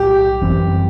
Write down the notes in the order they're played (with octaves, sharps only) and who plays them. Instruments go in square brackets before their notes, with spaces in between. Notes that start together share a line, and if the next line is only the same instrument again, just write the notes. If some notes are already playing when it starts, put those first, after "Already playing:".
Already playing: [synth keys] B1 A2 G3 [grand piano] G4
[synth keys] G1 F#2 E3 G3 C4